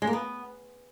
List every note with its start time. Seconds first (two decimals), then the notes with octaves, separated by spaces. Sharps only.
0.02 G#3
0.07 A#3
0.13 B3